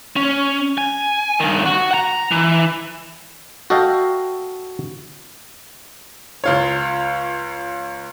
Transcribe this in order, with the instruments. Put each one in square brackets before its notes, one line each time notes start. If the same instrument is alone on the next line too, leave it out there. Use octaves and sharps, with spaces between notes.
[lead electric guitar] C#4
G#5
G2 D#3
F#4
F#5 A#5
E3
[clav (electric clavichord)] F#4 A4 D#5 F5 G5
[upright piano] C#2 F4 C#5